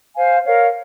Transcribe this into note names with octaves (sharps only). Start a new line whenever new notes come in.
C5 F5 G#5
A#4 C#5 F5